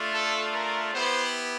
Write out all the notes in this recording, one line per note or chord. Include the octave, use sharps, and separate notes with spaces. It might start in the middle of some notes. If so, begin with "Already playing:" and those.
Already playing: A3 D4 F4
A4
A#4
B3 E4 G4 C5